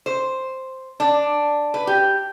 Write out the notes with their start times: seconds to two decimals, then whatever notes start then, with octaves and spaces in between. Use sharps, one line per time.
0.06 C5
1.00 D4
1.74 B4
1.87 G4